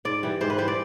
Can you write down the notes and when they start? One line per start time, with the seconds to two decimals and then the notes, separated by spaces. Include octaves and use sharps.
0.05 G#2 D5
0.23 E3 G3
0.41 G#2 C5
0.50 B4
0.58 E3 G3 C5
0.68 D5